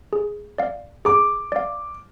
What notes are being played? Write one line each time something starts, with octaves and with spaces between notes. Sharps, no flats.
G#4
D5 F5
G#4 D6
D5 F5